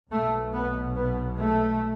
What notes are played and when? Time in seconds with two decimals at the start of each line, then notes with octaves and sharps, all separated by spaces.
0.10 B1 B2 A3
0.53 B3
0.95 B3
1.38 A3